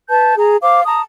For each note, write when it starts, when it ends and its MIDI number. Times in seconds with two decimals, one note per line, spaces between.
0.08 0.34 71
0.08 0.34 81
0.08 0.34 91
0.36 0.55 68
0.36 0.55 82
0.61 0.81 72
0.61 0.81 77
0.61 0.81 86
0.84 1.02 81
0.84 1.02 82
0.84 1.02 87